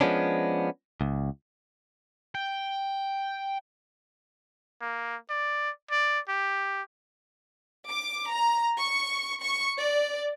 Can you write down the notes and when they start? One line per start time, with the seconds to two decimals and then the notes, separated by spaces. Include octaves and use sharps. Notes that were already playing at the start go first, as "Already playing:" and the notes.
0.01 F3 G#3 B3 C#4 D4
1.01 C#2
2.35 G5
4.81 A#3
5.30 D5
5.91 D5
6.28 G4
7.88 D6
8.32 A#5
8.77 C#6
9.41 C#6
9.78 D5